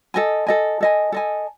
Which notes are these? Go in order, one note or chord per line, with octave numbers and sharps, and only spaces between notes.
A4 D#5 G#5
A4 D#5 G#5
A4 D#5 G#5
A4 D#5 G#5